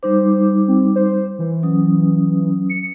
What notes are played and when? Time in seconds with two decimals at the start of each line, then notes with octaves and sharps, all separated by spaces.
0.03 G3 D#4 C5 D6
0.68 C4
0.96 C5
1.39 E3
1.63 F#3 C#4 D#6
2.70 C#7